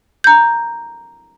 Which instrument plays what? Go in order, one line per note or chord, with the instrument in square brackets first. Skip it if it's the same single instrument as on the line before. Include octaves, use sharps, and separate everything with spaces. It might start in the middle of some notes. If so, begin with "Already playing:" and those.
[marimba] A#5 G6